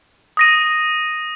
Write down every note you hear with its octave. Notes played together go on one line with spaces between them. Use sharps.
D#6 A#6 D#7